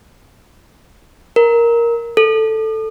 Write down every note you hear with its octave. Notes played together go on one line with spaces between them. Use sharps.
A#4
A4